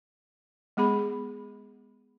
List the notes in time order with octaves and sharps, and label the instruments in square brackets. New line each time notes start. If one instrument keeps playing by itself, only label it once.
[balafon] G#3 B3 G#4 B5